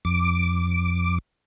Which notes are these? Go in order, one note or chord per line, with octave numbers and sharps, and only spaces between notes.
F2 D6